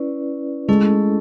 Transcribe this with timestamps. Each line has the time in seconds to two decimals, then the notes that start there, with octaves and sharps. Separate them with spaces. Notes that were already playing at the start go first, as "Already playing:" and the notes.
Already playing: C#4 E4 B4 D5
0.68 G#3 A3 C#4 E4 A4